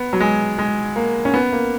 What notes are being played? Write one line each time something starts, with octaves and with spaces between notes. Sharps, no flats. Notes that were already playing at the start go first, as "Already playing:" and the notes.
Already playing: B3
F#3
G#3
G#3
A#3
C#4
B3
A#3